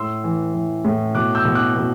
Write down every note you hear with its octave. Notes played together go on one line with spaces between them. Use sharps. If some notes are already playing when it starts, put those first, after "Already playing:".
Already playing: A2 C6 E6
E3
E3
A2
B2 D6 F#6
E6 G6
B2
D6 F#6
B2